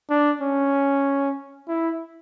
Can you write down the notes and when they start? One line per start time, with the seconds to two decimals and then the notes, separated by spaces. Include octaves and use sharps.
0.10 D4
0.41 C#4
1.68 E4